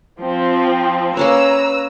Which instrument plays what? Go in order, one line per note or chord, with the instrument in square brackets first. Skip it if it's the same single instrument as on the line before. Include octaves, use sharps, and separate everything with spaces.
[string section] F3 C4
[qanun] A#3 C#4 C#5 [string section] B4 A#5 E6